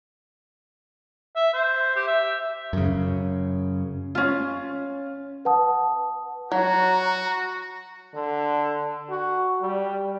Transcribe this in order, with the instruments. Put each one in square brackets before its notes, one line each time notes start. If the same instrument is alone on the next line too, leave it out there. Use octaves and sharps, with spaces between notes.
[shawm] E5
C5
G4
E5
[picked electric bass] F#2 C#3
[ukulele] C#4 F4
[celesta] B4 F#5 A5 D#6
[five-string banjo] F#3 [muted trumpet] F#4 [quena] A#5
[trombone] D3
F#4
G3